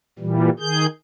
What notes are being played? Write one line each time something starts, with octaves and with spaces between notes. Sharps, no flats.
A#2 E3 G3
D#3 G#4 G6